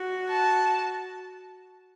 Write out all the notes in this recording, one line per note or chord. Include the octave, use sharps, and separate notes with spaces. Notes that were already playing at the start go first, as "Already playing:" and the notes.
Already playing: F#4
A5